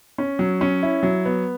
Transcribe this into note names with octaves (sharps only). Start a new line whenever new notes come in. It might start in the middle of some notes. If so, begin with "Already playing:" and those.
C#4
F#3
C#4
E4
F#3
B3